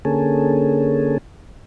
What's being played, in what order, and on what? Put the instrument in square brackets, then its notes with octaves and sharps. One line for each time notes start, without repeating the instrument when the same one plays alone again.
[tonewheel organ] D3 A#3 C#4 G#4 A4